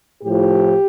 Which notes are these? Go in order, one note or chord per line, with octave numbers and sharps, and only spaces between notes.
A2 F3 G4